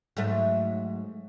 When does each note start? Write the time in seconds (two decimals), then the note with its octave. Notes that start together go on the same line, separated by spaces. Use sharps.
0.17 G#2 F#3 A3